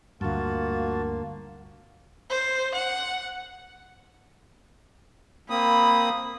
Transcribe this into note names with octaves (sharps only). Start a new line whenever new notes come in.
D2 G2 A#3 F4 F#4 A5
C5
F#5
A#3 C4 B5 D#6